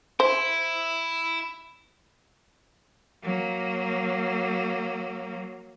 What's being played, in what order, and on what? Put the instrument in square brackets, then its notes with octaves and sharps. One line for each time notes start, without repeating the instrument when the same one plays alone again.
[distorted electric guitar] E4 [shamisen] C5
[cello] F#3 A#3